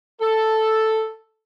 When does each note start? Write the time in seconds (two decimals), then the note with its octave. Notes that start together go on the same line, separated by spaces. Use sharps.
0.22 A4